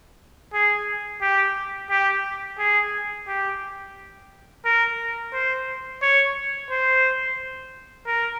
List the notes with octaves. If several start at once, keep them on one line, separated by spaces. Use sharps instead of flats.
G#4
G4
G4
G#4
G4
A#4
C5
C#5
C5
A#4